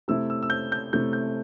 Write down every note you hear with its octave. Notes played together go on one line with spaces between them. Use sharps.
C3 A3 E4 E6
E6
E6
G6
G6
C3 A3 E4 G6
G6